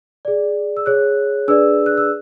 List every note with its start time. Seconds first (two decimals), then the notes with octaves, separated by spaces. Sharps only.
0.25 G#4 D5
0.77 E6
0.86 G#4 C#5 F#6
1.48 D4 G#4 B4 D5 E6
1.86 F#6
1.97 E6